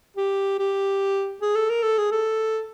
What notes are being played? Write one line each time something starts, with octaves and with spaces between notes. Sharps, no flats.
G4
G4
G#4
A4
A#4
A4
G#4
A4